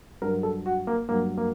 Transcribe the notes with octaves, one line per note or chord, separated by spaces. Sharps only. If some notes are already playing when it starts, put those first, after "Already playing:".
G2 F#3 A#4
A4
F#4
A#3
G2 F#3 A#3
A#3